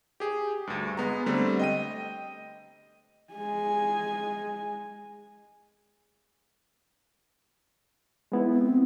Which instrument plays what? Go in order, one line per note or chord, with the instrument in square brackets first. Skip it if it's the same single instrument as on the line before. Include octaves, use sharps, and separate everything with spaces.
[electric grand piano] G4 G#4
D2 G2
G#3 B3 A#5
D3 G3 A3 C4
D#5 G5 D#7
[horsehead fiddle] G#3 G#5
[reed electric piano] G#3 B3 E4
[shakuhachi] C4